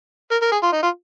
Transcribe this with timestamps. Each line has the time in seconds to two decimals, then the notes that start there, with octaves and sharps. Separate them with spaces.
0.31 A#4
0.42 A#4
0.52 G#4
0.63 F4
0.72 D#4
0.83 F4